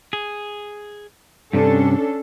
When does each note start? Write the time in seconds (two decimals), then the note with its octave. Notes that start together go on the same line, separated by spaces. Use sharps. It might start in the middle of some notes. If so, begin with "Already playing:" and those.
0.13 G#4
1.53 G2 C3 C#4 D4 A4